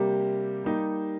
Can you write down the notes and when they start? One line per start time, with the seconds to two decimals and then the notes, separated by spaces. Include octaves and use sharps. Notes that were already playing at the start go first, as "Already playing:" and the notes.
Already playing: C3 G3 A#3 G4
0.64 G3 A#3 D#4 G4